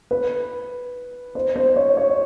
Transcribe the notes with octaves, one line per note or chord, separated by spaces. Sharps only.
B4
C5
C5
C#5
C#5